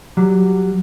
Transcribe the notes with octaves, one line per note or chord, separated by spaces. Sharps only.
F#3 G3